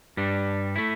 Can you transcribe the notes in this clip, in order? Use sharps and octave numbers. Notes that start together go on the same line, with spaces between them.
G2 G3 D4
A3 E4